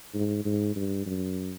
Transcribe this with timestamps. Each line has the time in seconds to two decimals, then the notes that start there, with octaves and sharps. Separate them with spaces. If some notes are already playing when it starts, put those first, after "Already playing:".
0.14 G#2
0.45 G#2
0.75 G2
1.06 F#2